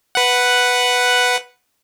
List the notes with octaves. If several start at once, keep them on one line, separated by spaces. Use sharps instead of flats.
B4 F#5